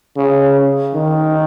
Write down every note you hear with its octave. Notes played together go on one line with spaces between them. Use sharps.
C#3
D#3